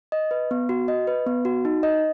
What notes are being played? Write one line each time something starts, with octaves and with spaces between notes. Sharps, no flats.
D#5
B4
B3
F#4
D#5
B4
B3
F#4
D#4
D#5